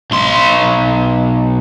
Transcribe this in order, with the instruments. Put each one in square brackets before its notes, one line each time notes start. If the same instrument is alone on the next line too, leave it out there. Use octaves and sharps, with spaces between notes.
[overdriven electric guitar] B1 C6